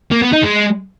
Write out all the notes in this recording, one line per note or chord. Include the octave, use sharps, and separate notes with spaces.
A#3
B3
D#4
G#3